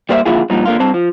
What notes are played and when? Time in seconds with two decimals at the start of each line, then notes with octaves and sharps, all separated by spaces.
0.09 G3 A#3 C5 D5 E5
0.26 D3 F3 A#3 E4 F4 G#4
0.50 G2 A#2 F3 D#4
0.65 D3 A#3 F4
0.79 G2 C4 C5 A5
0.94 F3